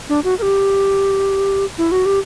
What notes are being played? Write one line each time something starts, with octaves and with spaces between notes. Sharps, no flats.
D4
F#4
A#4
G4
E4
F#4
G4